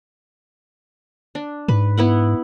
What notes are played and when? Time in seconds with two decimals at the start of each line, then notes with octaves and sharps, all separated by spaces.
1.35 D4
1.68 G#2 B4
1.98 B3 E4 F#5